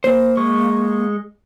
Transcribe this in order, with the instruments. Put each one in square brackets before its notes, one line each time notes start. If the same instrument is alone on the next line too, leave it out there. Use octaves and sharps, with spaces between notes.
[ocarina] A#3 [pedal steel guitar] C5
[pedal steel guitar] G#3 C#6